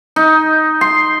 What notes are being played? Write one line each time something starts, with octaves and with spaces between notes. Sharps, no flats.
D#4
C6